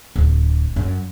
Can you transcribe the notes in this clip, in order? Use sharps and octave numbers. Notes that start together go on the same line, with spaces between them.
D1
F#2